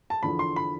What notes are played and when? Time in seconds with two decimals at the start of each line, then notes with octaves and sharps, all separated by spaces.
0.10 A5
0.22 E2 D3 F3 B5
0.39 C6
0.56 B5